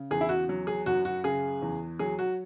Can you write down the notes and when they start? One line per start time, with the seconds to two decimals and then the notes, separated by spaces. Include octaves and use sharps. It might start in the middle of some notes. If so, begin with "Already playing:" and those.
Already playing: C#3
0.11 E2 G#4
0.21 E4
0.29 F#4
0.49 F#3
0.67 G#4
0.86 F#2 F#4
1.05 F#4
1.24 C#3 G#4
1.62 E2
1.99 F#3 G#4
2.19 F#4